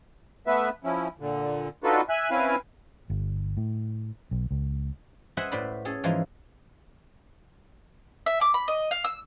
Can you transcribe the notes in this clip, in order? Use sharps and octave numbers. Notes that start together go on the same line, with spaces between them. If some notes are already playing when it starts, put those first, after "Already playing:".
A3 B3 B4 E5
F3 C#4 E4
A#2 D3
D4 D#4 F4 F#4 A4 B4
E5 G#5 F#6
C4 C#4 E4 B4 F5 G#5
G1
A2
B1
C#2
B4 C5 D#5 E5 F#5 G#5
A2 B4 C5 D5 B5
C#4 G#4 A4
G#2 E3 F3 G#3
E5
D6
B5
D#5
F5
E6